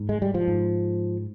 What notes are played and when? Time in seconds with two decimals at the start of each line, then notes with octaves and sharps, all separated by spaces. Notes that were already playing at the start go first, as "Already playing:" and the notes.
Already playing: G#2
0.09 G#3
0.22 G3
0.34 F3
0.48 G#2